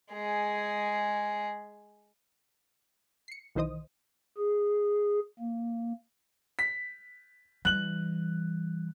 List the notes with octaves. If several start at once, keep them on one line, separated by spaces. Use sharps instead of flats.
G#3 G#4
C7 C#7
B1 D#3 E3 C5 D#5 D#6
G#4
A#3
B6
E3 G3 F#6 F#7